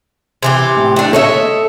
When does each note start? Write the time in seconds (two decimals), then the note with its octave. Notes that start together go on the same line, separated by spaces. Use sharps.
0.43 C3 E3 G4
0.77 A2
0.96 A3 D4
1.13 A4 C#5 D#5 E5